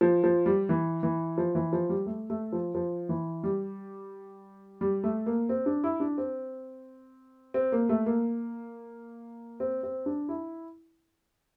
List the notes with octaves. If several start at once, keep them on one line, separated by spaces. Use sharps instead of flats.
F3
F3
G3
E3
E3
F3
E3
F3
G3
A3
A3
F3
F3
E3
G3
G3
A3
A#3
C4
D4
E4
D4
C4
C4
A#3
A3
A#3
C4
C4
D4
E4